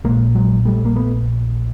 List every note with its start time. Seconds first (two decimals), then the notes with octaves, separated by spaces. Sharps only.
0.04 A#1 A#2 G#3 A#3
0.35 F#3 G#3
0.65 G3 A3
0.85 A#3
0.96 A3 B3